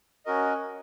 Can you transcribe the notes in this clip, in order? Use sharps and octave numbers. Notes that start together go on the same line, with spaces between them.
C#4 F#4 A#4 D#5